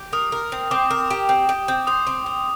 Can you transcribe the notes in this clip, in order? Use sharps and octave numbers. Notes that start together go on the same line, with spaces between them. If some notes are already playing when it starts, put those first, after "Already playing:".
Already playing: G4
A#4 D#6
A#4
C4
C4 D6
A#4
G4
C4
G4
C4
C5 D#6
C4
C4